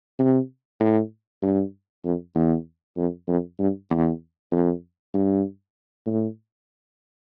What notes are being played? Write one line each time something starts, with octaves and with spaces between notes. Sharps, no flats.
C3
A2
G2
F2
E2
F2
F2
G2
E2
F2
G2
A2